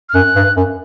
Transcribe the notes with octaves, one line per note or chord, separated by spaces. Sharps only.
F6
F#2 F#6
G2
F#2